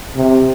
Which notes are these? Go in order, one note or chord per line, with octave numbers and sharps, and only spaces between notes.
C3